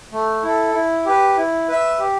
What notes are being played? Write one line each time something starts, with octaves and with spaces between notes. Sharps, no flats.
A3
E4 A4
E4
G4 B4
E4
B4 E5
G4